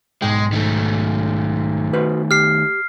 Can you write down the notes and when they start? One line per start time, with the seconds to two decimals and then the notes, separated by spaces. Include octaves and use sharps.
0.22 B1 G#2 G#3 G5
0.53 D#3 A3
1.93 F#4 B4 C5
2.31 G4 F6 C7